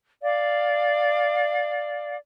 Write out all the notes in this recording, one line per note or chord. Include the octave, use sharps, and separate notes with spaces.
D5 F5